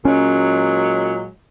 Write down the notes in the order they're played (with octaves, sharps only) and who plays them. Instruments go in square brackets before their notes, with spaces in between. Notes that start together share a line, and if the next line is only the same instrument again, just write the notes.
[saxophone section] A#2 F#3 G#3 [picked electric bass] C#4